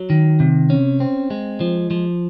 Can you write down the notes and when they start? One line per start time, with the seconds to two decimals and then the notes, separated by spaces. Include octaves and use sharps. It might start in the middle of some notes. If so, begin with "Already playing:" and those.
Already playing: F#3
0.10 D#3
0.40 C3
0.70 C#4
1.00 C4
1.30 G#3
1.61 F3
1.90 F3